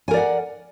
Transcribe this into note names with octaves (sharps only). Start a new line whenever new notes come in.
A#4 D5 F#5 G#5